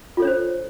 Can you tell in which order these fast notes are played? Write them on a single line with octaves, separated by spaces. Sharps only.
F4 A4 C#5 D4 C5